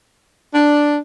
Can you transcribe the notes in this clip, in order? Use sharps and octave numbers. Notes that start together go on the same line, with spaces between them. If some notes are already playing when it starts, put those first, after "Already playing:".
D4